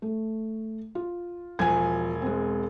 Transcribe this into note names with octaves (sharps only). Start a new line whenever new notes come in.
A3
F4
E1 F3 G#5 G#6
G#3 C4